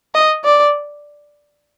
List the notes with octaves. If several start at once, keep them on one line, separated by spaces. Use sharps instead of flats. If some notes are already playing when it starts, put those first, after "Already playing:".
D#5
D5